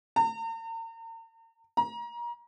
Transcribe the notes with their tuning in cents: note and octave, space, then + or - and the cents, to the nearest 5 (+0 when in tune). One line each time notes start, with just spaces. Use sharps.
A#5 -45
A#5 +30